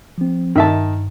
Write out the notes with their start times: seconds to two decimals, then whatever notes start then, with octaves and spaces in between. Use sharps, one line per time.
0.18 F3 C4
0.56 G2 D#3 E5 A5